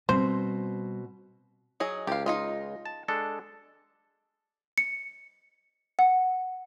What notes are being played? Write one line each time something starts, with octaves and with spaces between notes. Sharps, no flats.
B2 G3 C4 C5
F#3 G#4 D#5
C#2 G4 F5
D#4 F4 D#5
A5
G#3 D4 A4
C#7
F#5